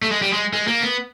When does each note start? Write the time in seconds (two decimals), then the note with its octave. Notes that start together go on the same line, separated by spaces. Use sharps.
0.02 A3
0.12 G#3
0.22 G3
0.33 G#3
0.53 G#3
0.67 A#3
0.81 B3